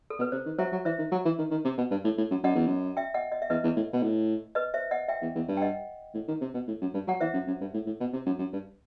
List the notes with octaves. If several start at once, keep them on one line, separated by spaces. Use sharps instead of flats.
A4
B2 B4
C3 C5
D#3
F#3 C5 E5
F#3
E3 C5 E5
D#3
F#3
E3
D#3
D#3
C3
B2
G2
A2
A2
F#2
F#2 D#5 F#5
E2
F#2
E5 G5
D#5 F#5
D#5
E5
E2 B4 D#5
E2
A2
B2
A2
B4 D#5
C5 E5
D#5 F#5
E5 G5
E2
E2
G2
G5
D#5 F#5
A2
D#3
C3
B2
A2
F#2
G2
F#3 F#5
E3 C5 E5
F#2
F#2
G2
A2
A2
B2
C3
F#2
F#2
G2